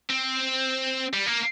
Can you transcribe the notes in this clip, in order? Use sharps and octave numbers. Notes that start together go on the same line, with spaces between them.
C4
G3
A#3